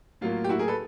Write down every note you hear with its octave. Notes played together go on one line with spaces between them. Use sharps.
A2 F#3 A#3 F4
G4
E4 F#4
G#4 A#4
A4 B4